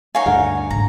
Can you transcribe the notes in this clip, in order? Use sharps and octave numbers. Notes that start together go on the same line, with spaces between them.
D#4 C#5 F5 G#5
D2 G2 D3 A#4 F#5
G#1 E3 A#5